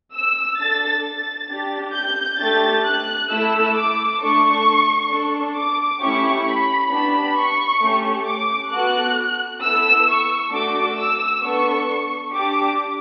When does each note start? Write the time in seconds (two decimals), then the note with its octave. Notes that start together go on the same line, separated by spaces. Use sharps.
0.14 E6
0.59 D4 A4 A6
1.05 A6
1.50 D4 G4
1.95 G6
2.40 A3 D4 G4 A6
2.85 F#6
3.30 A3 E4 A4 E6
3.76 D6
4.21 A3 D4 A4 C#6
5.10 D4 A4
5.56 D6
6.02 A3 C#4 E4 G4 C#6
6.47 B5
6.92 B3 D4 G4 B5
7.37 C#6
7.82 A3 C#4 G4
8.27 D6
8.73 B3 F#4 A4 F#6
9.63 B3 E4 A4 E6
10.08 C#6
10.52 A3 D4 F#4 A4 D6
10.98 E6
11.44 B3 D4 A4 C#6
12.33 D4 G4 D6